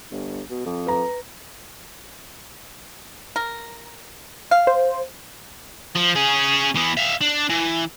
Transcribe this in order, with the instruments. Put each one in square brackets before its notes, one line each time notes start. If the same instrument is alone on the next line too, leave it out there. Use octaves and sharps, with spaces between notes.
[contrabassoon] G1
B2
F2
[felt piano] B4 A#5
[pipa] A#4
F5
[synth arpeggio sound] C5
[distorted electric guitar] F3
C#4 G#4
E3 B3
E5 F5
D4
E3